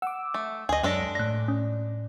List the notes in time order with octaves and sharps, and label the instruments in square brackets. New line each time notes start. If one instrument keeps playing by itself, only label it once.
[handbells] F#5 [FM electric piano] D6 E6
[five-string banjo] A3
[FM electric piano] D2 [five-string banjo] G#4 D#5
[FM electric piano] F#2 C#5 A#6 [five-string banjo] G#3 D4 A4
[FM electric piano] A2 D5 [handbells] F#6 A#6
[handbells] C#4